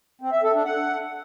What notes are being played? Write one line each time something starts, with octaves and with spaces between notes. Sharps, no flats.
C4
E5
A4
D4
F#5